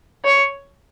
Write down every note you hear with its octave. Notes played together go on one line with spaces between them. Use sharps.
C#5